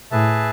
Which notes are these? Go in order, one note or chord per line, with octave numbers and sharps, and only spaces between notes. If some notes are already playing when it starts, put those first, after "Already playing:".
A2 G#4 B4 E5 A5